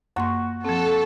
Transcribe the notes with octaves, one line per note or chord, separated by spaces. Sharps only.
F#2 A#3 F#4 C6 C#6
F3 C4 A4